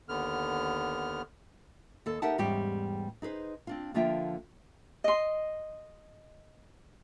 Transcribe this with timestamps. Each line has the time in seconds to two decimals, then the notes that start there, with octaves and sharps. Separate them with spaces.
0.09 D#2 D3 B3 F6
2.06 D#2 A4
2.22 D#4 G4 A#4 E5 F#5 A5
2.38 E2 G#2 G3 C#4 G4
3.22 D#4 G#4 B4 C5
3.67 C4 D4 F4
3.94 D3 F3 A#3 F4 E5 G5
5.04 D#5 C6